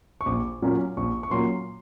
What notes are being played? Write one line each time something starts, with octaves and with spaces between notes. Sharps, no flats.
C#6
A#1 D6
A#2 F#3 A#3 C#4
A#1 C#6
C#6
A#2 F#3 A#3 C#4 C6